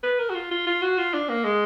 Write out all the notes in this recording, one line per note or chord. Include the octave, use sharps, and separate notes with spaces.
B4
A#4
F#4
F4
F4
F4
F#4
F4
D4
A#3
G#3